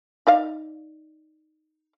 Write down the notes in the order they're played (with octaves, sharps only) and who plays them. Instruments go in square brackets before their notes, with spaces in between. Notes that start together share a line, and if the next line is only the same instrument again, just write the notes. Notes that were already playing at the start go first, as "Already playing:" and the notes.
[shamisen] D#4 D5 F5